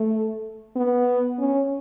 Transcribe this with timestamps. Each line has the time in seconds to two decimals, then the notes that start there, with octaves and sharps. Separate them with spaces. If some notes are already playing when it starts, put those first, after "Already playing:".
Already playing: A3
0.76 B3
1.39 C#4